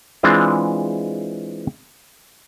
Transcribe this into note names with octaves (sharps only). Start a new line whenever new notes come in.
E3 G#3 C4 D4 F4